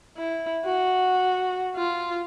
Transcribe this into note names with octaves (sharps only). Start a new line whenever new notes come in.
E4
F#4
F4